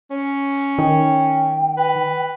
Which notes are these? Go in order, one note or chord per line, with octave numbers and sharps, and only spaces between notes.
C#4
D#3 G5
B4